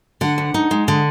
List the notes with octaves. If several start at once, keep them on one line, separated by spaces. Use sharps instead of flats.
D3 F#5
D2
D#4
G#3
D3